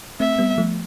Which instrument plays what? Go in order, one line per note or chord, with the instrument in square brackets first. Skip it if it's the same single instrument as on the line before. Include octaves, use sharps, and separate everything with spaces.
[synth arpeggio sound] A3 C4 [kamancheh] E5
[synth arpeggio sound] G3 B3
F3 A3